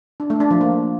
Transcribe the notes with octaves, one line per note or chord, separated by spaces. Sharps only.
D4
A3
D4
F3
A#3